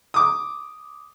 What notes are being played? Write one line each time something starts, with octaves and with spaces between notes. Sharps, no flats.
D6 D#6